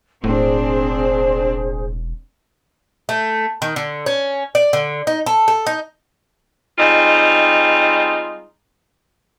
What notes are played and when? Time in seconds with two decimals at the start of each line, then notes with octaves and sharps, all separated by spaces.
0.24 E1 A2 C4 D4 G#4 C5
3.09 A3
3.62 D#3
3.76 D3
4.06 C#4
4.55 D5
4.73 D3
5.07 D#4
5.26 A4
5.48 A4
5.67 D#4
6.78 G3 G#3 C4 D#4 F4